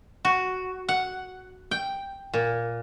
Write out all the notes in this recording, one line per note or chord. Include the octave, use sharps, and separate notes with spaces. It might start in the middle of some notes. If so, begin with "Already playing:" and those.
F#4
F#5
G5
A#2